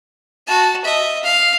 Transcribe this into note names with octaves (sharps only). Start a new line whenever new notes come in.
F#4 A5
D#5 E5
F5